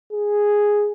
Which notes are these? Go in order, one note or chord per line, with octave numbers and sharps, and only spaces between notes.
G#4